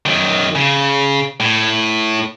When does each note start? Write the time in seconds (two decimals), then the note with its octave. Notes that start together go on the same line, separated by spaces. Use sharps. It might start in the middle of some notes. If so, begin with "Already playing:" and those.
0.06 F#2 D#3
0.55 C#3
1.40 A2